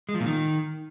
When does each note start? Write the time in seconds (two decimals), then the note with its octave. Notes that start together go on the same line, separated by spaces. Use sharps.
0.09 G#3
0.14 F3
0.20 A#2
0.26 D#3